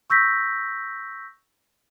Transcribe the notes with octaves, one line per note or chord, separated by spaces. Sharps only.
C#6 E6 G6 A#6 B6